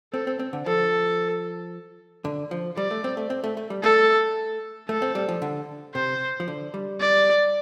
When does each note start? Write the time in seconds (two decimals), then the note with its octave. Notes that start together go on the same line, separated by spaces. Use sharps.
0.13 C4 A4
0.27 C4
0.39 C4
0.53 D3
0.66 F3 A4
2.25 D3
2.51 F3
2.77 G3 D5
2.91 A3
3.04 C4
3.17 A3
3.30 C4
3.44 A3
3.57 A3
3.70 G3
3.83 A3 A4
4.89 A3 A4
5.02 C4
5.15 G3
5.29 F3
5.42 D3
5.95 C3 C5
6.40 F3
6.48 D3
6.74 G3
7.00 D5